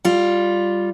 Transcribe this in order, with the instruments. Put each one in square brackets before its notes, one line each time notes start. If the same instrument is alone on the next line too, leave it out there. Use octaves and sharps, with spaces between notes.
[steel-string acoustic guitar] G3 F4